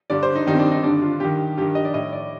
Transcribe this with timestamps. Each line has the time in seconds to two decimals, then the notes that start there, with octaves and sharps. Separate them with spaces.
0.10 G2 D3 D5
0.23 C5
0.35 D#4
0.47 G2 D#3 D#4
0.53 C4
0.59 D4
0.71 D#4
0.83 G2 D3 D4
1.02 F4
1.20 G2 D#3 G4
1.57 G2 D#3 G4
1.75 D#5
1.85 D5
1.94 A2 D#5
2.13 D5